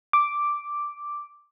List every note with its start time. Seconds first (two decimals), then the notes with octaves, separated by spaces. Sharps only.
0.13 D6